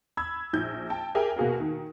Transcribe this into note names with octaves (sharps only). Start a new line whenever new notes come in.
B5 E6 G#6
A#1 G6
G5 A5
G4 G#4 A#4 E5 G5 G#5
B2 A#3 F#4 G#4 A#4
D#3